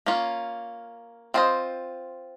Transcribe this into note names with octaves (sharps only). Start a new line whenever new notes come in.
A#3 C#4 F4
C4 F4 C5 D#5